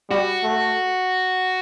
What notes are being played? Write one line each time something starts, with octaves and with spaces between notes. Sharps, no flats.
G3 F#4
A3